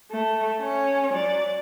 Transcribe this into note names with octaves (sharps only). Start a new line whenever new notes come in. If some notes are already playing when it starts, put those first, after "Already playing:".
A3
C#4 C#5
F#3 D5